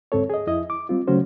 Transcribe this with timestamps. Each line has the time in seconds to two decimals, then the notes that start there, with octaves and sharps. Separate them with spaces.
0.12 D2 G#2 C4 A4 C#5
0.30 G#4 D#5
0.47 F2 E4 D#5
0.70 D6
0.89 G3 C4 F4
1.08 C#3 F#3 A3 C#4 F#4 C5